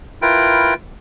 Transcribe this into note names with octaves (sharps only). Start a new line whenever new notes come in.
E4 F4 A#4 B4 G5